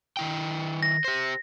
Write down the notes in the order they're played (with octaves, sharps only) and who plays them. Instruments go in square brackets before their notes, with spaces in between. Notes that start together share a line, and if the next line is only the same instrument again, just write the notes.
[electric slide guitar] D#3 E4 G5
[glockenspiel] A#6
[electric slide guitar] G4 C5